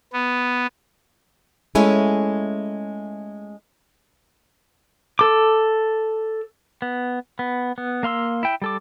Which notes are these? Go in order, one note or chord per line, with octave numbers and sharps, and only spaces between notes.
B3
G#3 A3 C#4 E4
A4 D6
B3
B3
B3
A#3 F5 C6 E6
E4 G5
G3 A4 D6